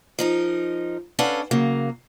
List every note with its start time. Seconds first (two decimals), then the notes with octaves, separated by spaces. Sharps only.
0.19 F3 D#4 A#4
1.19 C#4 D4 A4 B4 F5 F#5
1.51 C#3 F#3 A#3